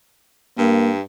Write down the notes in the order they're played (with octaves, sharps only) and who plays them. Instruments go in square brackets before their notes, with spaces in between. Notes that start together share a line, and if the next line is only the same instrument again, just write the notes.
[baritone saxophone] G2 [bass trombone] A#3